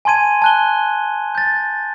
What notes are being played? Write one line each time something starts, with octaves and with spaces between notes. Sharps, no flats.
G#5 A5 C6 G#6 D#7
A5 F#6 G7
G6 A6